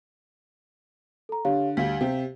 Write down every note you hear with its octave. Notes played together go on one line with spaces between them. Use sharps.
A4 A#5
D3 G4 C#5 F5
D2 G3 F5 B6
C3 G4